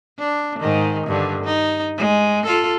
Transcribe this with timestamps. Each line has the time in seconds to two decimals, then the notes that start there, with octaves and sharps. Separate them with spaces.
0.19 D4
0.59 G#2 D#3
1.07 G2 D3
1.44 D#4
1.97 G#3
2.46 F4 A4